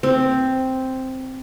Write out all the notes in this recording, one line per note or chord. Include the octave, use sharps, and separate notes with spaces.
C4